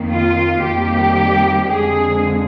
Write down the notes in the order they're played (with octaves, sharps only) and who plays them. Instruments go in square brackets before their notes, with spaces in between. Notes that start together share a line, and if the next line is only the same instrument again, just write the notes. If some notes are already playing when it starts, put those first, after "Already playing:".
Already playing: [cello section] F2 D#3 A#3
F4
F2 D#3 G3 A#3 G4
F2 D3 G#3 G#4